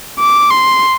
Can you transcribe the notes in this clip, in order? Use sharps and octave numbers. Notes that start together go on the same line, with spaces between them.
D6
C6